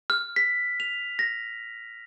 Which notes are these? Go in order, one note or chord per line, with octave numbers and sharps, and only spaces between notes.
F6
B6
F7
A#6